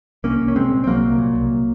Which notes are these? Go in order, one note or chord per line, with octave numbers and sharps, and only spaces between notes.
C2 A#3 C#4
C2
C#4
C2 G#3 C4
A#2
C4
C2 F#3 A#3
C2
A#2
C2